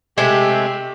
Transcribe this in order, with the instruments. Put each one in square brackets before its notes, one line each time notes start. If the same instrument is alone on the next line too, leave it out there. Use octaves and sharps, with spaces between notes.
[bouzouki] C3 G#3 A3 [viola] G4